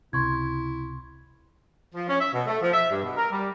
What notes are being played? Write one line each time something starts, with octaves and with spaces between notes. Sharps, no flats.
C#2 C3 E4 C6 C#6 G#6
F3
C#4
E5
B2
A3
F3
E5
G2
B2
A#4
G3